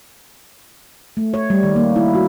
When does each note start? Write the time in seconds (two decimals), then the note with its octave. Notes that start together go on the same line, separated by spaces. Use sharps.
1.17 A3
1.34 C#5
1.50 G3
1.63 D#3
1.76 A#3
1.96 E4
2.15 F#4